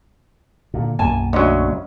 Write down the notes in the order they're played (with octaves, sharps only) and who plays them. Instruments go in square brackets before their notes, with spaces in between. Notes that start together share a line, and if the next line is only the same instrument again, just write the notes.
[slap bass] A#2 D3
[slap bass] B1 F#2 A#3 [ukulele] G#5 A5
[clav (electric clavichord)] D2 F#3 [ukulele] C#4 D#5